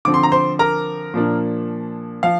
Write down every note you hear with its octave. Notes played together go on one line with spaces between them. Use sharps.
D3 F3 C4 D6
C6
A#5
C5 C6
A#4 A#5
A#2 F3 A#3 D4
F3 F5